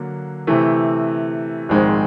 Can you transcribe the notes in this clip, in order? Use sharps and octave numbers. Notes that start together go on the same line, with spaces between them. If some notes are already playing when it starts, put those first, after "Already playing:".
Already playing: D3 F#3 A#3
C3 E3 A3
A#1 G#2 D#3 G#3 C4